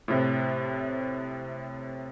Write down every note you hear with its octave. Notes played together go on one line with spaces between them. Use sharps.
A2 C3